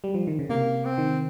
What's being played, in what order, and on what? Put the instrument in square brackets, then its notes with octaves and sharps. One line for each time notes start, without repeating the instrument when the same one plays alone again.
[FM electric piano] G3
F3
D#3
C#3
[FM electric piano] C3 [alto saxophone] A#3
[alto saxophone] C4
[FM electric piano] D#3